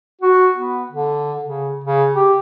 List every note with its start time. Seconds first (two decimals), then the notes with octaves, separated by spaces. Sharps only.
0.21 F#4
0.56 B3
0.92 D3
1.45 C#3
1.84 C#3
2.15 G4